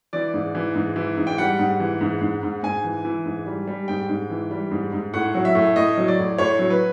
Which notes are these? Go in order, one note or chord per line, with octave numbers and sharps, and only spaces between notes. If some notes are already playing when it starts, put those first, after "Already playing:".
E3 D5
G#2
E3
G#2
E3
G#2
G5
G3 F#5
G#2
E3
G#2
G#2
G#2
G#2 G#5
E3
E3
G#2
G3
G3
G#2 G5
G#2
E3
G3
G#2
G#2
A2 F#5
F#3
E5
A2
A2 D#5
F#3
D5
A2
A2 C#5
F#3
B4